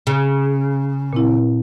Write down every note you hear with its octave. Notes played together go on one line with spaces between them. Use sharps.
C#3
A#2 C4 E4